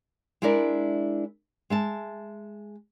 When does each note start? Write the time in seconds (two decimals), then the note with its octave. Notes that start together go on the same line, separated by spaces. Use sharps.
0.42 G#3 D4 E4 A#4 D5 E5
1.70 G#3 E5 A5